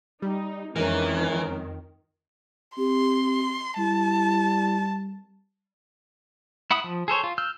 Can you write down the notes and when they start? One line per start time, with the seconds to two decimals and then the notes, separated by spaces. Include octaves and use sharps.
0.22 G3 D#4
0.76 F2 D#3 E3 G#3 C#4 A#4
2.78 C4 G4 C6
3.78 G3 E4 A5
6.71 E4 F#5 B5 D#6
6.84 F3
7.08 G#4 A4 C5 C#5
7.24 F4
7.38 E6 F6 G6